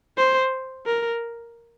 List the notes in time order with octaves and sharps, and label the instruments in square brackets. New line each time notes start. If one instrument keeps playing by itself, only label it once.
[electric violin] C5
A#4